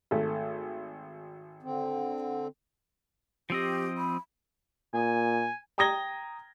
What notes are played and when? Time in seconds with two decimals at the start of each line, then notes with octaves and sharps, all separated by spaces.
0.11 G#1 A3
1.63 D3 C4
3.50 F3 C4 G4 D#5
3.97 B5
4.94 A#2 G#5
5.78 G5 A#5 D#6 G#6 A#6 G7